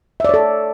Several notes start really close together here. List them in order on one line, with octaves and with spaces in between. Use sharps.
E5 D5 C#5 A4